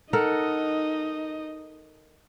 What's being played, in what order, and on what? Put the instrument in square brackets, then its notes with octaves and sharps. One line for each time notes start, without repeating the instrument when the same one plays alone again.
[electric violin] D#4 D#5 [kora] A4 A#4 F#5